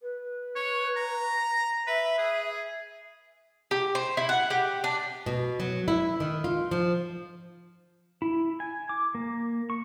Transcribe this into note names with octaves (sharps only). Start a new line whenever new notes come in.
B4
C#5
A#5
B4 E5
G#4
G4
C5
E4
F#5
G4
D4
B2
F#3
E4
D#3
F4
F3
E4
G#5
D6
A#3
C#6